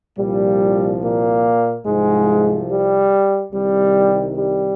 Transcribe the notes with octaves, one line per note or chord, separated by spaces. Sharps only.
C2 A#2 F3 G3
A#2 A#3
C2 G#2 C3 F3 G#3
G3
C2 C3 D#3 G3
G3